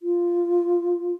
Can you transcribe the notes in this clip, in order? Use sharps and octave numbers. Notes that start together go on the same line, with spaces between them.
F4